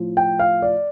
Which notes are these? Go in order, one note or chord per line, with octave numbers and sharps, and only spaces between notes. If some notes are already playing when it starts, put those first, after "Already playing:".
Already playing: A2 F3
G5
F5
D5